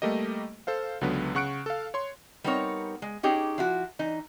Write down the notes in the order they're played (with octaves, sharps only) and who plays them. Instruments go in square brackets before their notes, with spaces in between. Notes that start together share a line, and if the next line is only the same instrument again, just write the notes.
[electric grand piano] G3 A3 A#3 G4 D#5
A4 C5 F5
C#2 D3 F#3 B3 B4
C#3 F#5 C#6 F#6 C#7 D7
A4 F5
C#5 C6
[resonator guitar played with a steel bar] G3 B3 C4 D#4 A#4 C#5
G#3
C#4 D#4 G4 G#4
F3 E4 F#4
E3 D#4